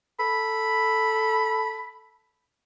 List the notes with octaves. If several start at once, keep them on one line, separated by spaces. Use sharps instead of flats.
A4 B5